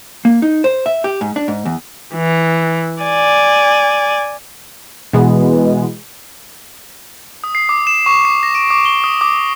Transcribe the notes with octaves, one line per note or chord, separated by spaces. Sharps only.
A#3
D#4
C5
E5
G4
G#2
D4
G#2
E2
E3
D5 G#5
B2 E3 G#3 B3
D#6
C7
D6
E7
C#6
C7
A#6
D7
D6
G7
D#6
D6